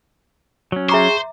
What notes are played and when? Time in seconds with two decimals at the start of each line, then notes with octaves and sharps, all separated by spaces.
0.72 F#3 C#4
0.89 G#4 C5 E5 A#5 C#6 D6